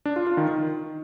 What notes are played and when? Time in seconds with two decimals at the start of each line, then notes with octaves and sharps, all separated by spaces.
0.06 D4
0.16 F4
0.27 F4
0.37 D#3
0.48 D#3